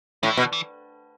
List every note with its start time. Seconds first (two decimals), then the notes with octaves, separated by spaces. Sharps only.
0.23 A2 E3
0.37 B2
0.53 E3